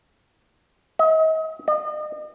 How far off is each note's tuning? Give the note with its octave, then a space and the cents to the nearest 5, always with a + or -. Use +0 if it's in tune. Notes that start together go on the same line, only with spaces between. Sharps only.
D#5 +40
D#5 -40